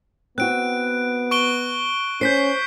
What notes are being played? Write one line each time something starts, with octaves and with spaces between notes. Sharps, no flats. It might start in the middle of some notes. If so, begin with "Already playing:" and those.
B3 C4 F#4 F#6 D7
C#6 D7 G7
C#4 C5 G6 B6 C7